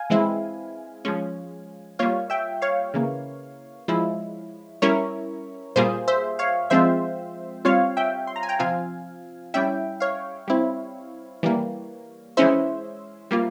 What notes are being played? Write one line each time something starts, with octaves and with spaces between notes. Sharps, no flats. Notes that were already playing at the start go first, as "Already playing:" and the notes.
Already playing: F5 G#5
E3 G#3 C4 E4
F3 G#3 C#4
G3 A#3 F4 C#5 F5
E5 G5
C#5 F5
C#3 E3 A#3
F3 G#3 E4
G3 C#4 E4 A#4 C#5
A#2 G3 A#3 F4 G#4 C5
C5 E5
C#5 F5
F3 G#3 C4 F4 C5 E5
G3 C4 F4 C#5 F5
E5 G5
C6
A#5
G#5
G5 A#5
C3 F3 C4 F4 F5 G#5
G3 C#4 E4 E5 G5
C#5 F5
G3 C4 E4
E3 G3 A#3
E3 G#3 C#4 E4 C5 E5
G3 A#3 F4